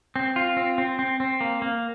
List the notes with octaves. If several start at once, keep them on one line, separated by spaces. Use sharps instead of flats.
C4
F4
C4
C4
C4
C4
A#3
A#3